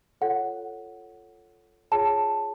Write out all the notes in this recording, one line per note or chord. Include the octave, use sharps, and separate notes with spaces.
F4 A4 C#5 F#5
F4 G#4 C#5 A5